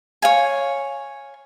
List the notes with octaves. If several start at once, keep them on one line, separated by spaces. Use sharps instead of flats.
C#5 F5 G#5